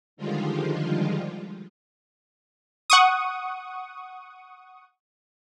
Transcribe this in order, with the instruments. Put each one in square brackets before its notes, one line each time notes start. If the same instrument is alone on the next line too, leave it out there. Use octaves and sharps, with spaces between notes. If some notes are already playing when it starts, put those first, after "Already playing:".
[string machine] D3 D#3 F3 G3 G#3 F4
[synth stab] F#5 C#6 D#6